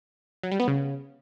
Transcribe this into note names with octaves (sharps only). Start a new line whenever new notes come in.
F#3
G3
B3
C#3